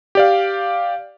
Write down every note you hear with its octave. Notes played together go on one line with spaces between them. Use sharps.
G4 D5 F5